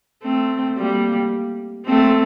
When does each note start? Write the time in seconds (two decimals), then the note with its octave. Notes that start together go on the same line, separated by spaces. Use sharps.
0.23 A3 C4
0.77 G3 A#3
1.87 A3 C4